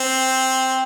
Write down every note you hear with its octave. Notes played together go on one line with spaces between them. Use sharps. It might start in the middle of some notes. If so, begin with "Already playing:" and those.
Already playing: C4